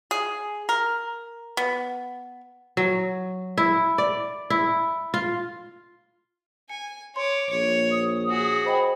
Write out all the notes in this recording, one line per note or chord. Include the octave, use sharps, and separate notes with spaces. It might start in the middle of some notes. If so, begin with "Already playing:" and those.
G#4
A#4
B3
F#3
E4
D5
E4
F4
G#5 C#7
C#5 C6 D6
A#1 C#5
D#6
F#4 G#4
C5 D#5 G5 B5